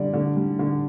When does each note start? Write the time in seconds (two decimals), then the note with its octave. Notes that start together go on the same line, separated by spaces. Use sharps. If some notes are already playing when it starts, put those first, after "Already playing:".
Already playing: D3 G3 D5
0.13 D3
0.36 G3
0.59 D3